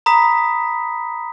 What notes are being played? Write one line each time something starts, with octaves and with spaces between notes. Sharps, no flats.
A#5 B5 D#6 B6